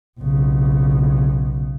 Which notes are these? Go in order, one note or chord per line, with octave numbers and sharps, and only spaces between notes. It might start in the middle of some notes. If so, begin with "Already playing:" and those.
B1 C#3